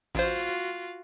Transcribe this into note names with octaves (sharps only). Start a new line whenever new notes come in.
A1 F4 F#4 C5